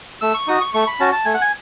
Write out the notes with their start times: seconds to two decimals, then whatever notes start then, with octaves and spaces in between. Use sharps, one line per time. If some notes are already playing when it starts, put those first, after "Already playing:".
0.21 A3 E6
0.34 C#6
0.47 D#4 F#4 D#6
0.61 C#6
0.74 A3 C#6
0.87 B5
1.00 C#4 F#4 A5
1.12 A5
1.25 A3 G#5
1.34 F#5
1.41 G#5